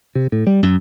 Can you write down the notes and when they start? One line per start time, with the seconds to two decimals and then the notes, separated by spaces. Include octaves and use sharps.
0.15 C3
0.32 A2
0.47 G3
0.63 F#2